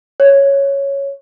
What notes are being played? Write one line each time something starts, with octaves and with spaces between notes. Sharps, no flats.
C#5